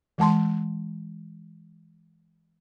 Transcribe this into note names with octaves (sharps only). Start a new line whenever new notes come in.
E3 G#3 A5 C6